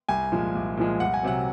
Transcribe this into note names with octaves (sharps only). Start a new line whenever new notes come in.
C2 G#5
A#2 F3 G#3
C2
A#2 F3 G#3
C2 F#5
G#5
C3 F#3 F#5